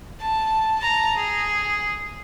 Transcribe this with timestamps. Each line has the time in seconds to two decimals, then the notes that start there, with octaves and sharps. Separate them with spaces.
0.20 A5
0.79 A5 A#5
1.16 G#4